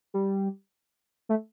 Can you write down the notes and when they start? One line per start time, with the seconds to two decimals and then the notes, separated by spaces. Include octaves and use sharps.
0.14 G3
1.29 A3